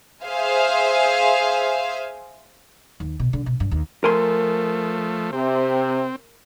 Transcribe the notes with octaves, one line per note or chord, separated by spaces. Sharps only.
G#4 C5 E5 F5 G#5
D#2
B2
D3
B2
G2
D#2
F3 A3 A#4 G#5 C6
C3 C4